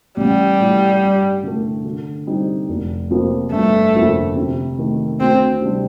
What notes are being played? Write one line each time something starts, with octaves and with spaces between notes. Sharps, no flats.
A1 G3
A2 F3
G2
D3 A3
D3
G3 C4 D#4
F1
F2 C3 F3 A#3
G1 A3
F2 D3 F3 A#3
C3
D#3 A3
D2 C4
C3 G3 D4